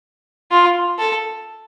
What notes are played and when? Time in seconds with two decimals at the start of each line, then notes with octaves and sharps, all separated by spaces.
0.52 F4
0.99 A4